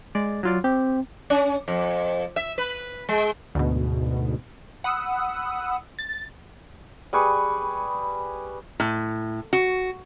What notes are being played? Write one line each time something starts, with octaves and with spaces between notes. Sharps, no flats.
G#3 D5
F#3 F4 D5
C4 G4
C#4
F2
E5
B4
G#3
D2 G#2 B2
F#5 B5 D#6 E6
A6
G3 G#4 B4 C#6
A2
F#4